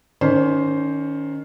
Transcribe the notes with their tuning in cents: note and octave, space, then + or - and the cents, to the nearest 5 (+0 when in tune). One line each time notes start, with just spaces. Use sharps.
D#3 +0 C#4 +20 C5 +0